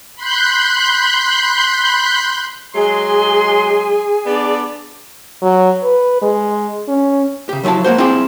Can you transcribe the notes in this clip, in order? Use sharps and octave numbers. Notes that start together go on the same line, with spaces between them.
B5 C6 F#6 G6
F#3 G#3 G#4 C6
B3 D4 D5
F#3
B4
G#3
C#4
C#3 G4
F3 F#3 C#4 E4 A5
G#3 A#3 F#4 C5
C4 E4 F4 G#4 D5